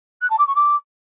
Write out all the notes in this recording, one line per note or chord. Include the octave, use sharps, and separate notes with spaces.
F#6
A5
D6
C#6
D6